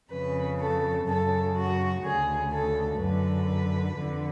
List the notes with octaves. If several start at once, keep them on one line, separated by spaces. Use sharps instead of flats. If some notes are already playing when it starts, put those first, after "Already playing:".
F2 C#3 B4
A4
F#2 C#3 A4
F#4
D2 C#3 G#4
A4
F#2 D3 B4
F2 D3